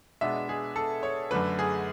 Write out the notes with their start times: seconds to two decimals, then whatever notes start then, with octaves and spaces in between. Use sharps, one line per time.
0.21 B2 G#3 B3 D4 E5
0.49 G#4
0.76 A4
1.03 C#5
1.31 F#2 D3 A3 D4 B4
1.59 G#4